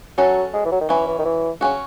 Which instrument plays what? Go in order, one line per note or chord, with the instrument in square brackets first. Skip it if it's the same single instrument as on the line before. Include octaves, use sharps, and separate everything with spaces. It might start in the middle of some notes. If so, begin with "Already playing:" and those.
[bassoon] F#3 [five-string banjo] C#4 F#4 A4
[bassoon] G#3
E3
F#3
D#3
[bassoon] E3 [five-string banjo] F#3 C#4 E4
[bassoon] E3
D#3
E3
[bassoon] C#3 [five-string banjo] F#3 C#4 F#4